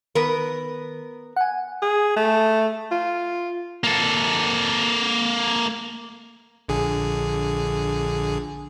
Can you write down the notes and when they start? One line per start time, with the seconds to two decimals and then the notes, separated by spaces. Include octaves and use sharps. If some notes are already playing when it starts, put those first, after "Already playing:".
0.15 D#3 B3 A#4
1.36 F#5 G#5
1.82 G#4
2.16 A3
2.91 F4
3.84 A#3 A4
6.69 A#1 D3 G#4